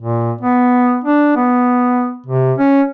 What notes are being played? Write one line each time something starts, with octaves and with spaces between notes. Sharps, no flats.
A#2
B3
D4
B3
C3
C#4